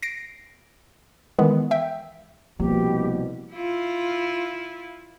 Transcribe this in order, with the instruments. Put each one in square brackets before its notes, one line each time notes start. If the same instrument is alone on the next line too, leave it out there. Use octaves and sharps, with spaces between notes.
[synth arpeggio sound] A#6 C7 D7
D#3 E3 G#3 B3
E5 G5
[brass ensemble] C2 B2 [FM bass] F3 [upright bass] A#3 [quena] G4
[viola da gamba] E4 F4